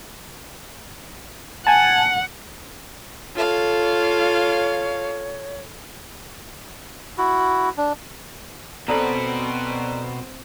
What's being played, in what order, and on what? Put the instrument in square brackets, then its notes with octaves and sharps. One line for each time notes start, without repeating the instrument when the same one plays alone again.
[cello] F#5 [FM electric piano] G#5 A5
[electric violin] F4 [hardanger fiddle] A4 F5 [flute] C#5
[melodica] E4 F#4
D4
[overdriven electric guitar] B2 B4 [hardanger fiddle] C4 C5 [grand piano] A4 D5 A#5